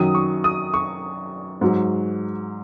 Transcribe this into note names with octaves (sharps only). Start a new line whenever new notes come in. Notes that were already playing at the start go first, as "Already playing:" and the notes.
Already playing: F#2 D#3 F#3 D#6
C#6
D#6
C#6
G#2 F#3